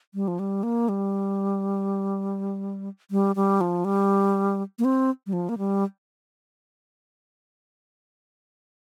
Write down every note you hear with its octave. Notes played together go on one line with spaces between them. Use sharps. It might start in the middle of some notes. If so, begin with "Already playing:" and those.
G3
F3
G3
A#3
G3
G3
G3
F3
G3
A#3
C4
G3
F3
A#3
G3